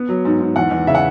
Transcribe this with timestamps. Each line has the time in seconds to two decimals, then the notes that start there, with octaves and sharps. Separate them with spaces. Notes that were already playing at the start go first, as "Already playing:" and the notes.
Already playing: B3
0.09 F#3
0.25 G#2
0.40 G#2
0.56 E2 F#5
0.71 E2
0.87 C#3 E5
0.95 F#5